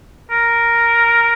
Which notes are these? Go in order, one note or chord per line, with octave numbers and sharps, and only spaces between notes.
A#4